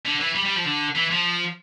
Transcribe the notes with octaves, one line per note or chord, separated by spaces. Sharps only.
D3
E3
G3
G3
F3
D3
E3
F3